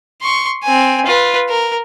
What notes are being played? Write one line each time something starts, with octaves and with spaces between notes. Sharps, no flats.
C6 C#6
C4 G#5
F4 B4
A#4